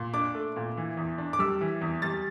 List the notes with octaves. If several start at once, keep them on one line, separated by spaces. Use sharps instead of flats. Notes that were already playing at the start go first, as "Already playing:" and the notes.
Already playing: A#2
D4 D6
A3
A#2
E3
E2
D4
D6
G3 E6
E3
E2
G3 A6